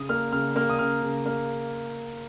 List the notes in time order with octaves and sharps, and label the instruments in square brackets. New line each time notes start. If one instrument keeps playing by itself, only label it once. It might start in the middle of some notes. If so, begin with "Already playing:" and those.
Already playing: [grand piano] C#3 D#6
A#3 F6
C#3 F6
A#3 F6
D#6
C#3 F6
C#3
A#3